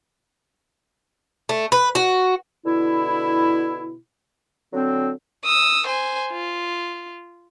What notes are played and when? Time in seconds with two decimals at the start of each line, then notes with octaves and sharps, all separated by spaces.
1.49 A3
1.72 B4
1.95 F#4
2.66 B2 D3 E4
4.73 D3 F#3 C4
5.45 D#6 E6
5.87 C5 G#5
6.31 F4